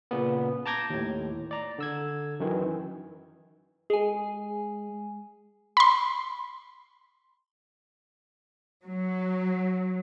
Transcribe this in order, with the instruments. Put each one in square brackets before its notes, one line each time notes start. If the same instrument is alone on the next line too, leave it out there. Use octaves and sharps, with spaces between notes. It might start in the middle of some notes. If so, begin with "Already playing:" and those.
[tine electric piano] A#2 C#3 A#3 B3
A5 A#5 D6 G6 G#6 A#6
D#2 A2
D5 A#5
D3 E6 G#6
F#2 D#3 E3
[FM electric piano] G#3 [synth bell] G#4 G#5
[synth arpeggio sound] B5 C6
[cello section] F#3